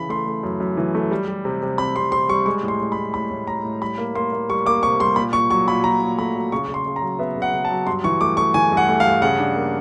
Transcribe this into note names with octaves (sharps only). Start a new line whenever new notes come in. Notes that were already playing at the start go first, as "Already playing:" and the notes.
Already playing: C#3 E3 B5
A3 C6
A3
F#2
F#2
E3
A3
G3
G3
C3
C3
C4 B5
C3 C6
C3 C6
G3 C#6
G#3 C#6
A2
C6
A2
B5
A2
A2 B5
A2
A2 A#5
A2
G3 B5
A#3
A#3 C6
A#3
G3 C#6
A#3 D6
C3 C#6
G3 C6
A#2 B5
A#2 C#6
F#3 C#6
A#2 B5
A#2 A#5
A#2
A3 B5
F#3
C#3 C#6
C#3
C6
C#3
A#5
F#3
B3 E5
C#3
F#5
C#3
A5
F#3
G2 C6
E3 C#6
A3 D6
A3 C#6
E3 G#5
G2
F#5
A3
F5
G2
C#3 F#5
D4
A#3